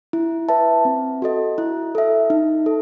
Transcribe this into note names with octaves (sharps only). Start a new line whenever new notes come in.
E4
B4 E5 A5
C4
F#4 A4 D#5
E4
A4 E5
D#4
A4